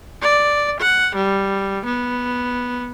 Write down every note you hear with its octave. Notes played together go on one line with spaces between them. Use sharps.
D5
F#5
G3
B3